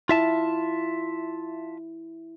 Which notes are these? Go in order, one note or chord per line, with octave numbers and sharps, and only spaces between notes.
E4 F4 E5 A5